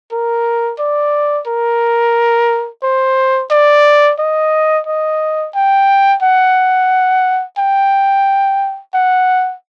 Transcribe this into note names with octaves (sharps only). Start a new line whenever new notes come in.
A#4
D5
A#4
C5
D5
D#5
D#5
G5
F#5
G5
F#5